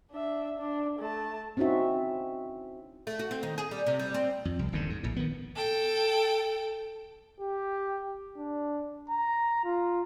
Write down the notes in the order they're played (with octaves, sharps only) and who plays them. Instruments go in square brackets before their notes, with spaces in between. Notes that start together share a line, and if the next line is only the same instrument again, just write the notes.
[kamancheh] D4 E5
D4
A3 A5
[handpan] C4 C#4 D#4 E4 F#4 E5
[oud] A3
F#4
C4
D#3
G#4
G3
C3
G3
C4
[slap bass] F2
C2
D#1 G#2 D3
G#2
A#1 A2
D#3 B3
[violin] A4 G5
[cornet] G4
D4
A#5
F4